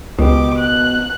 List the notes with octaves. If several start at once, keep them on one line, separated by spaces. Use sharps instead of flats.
C#2 B2 G4 D6
F#6